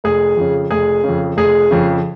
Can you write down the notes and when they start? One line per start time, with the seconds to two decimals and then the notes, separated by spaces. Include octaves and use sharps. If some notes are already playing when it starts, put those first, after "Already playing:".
0.04 F1 G#4
0.37 F2 C#3
0.71 F1 G#4
1.04 C#3
1.09 F2
1.37 F1 G#4
1.71 F2 C#3